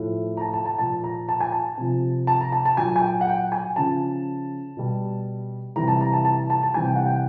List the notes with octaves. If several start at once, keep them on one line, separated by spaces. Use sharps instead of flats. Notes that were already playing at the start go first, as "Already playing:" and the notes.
Already playing: A2 F3
A#5
A5
A5
A5
A#2 F3 A5
A#5
A5
G#5
A5
C3 F3
A5
A#5
A5
A5
A#2 F#3 G#5
G#5
G5
F#5
G5
G#5
C#3 F3 A5
B2 G3
C3 E3 G3 A#5
A5
A#5
A5
A5
A5
A5
C3 E3 G3 G#5
G5
F#5
G5